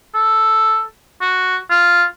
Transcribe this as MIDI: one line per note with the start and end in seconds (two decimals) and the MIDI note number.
0.15 0.82 69
1.22 1.57 66
1.71 2.04 65